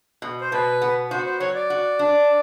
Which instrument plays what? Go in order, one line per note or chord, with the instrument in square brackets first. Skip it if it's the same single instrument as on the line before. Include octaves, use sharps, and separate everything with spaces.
[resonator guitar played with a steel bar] B2
[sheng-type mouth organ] C5
[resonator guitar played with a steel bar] B2 [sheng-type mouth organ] B4
[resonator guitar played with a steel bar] B3
[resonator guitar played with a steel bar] F#4 [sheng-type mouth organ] C5
[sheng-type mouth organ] C5
[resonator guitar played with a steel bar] F#3 [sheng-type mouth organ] C#5
[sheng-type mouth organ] D5
[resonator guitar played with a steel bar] F#4
D4